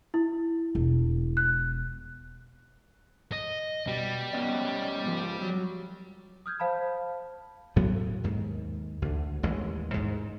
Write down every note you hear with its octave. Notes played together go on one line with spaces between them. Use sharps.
E4
E1
F#6
D#5
B2 G3
B3 C#4 D#5
G#2 F3
F#3
D#6 F6 G6 G#6
C5 F5 A5 B5
D2 A2 F#3 B3
D#2 G#2
D2 D3
A1 D#2 G#3
G#2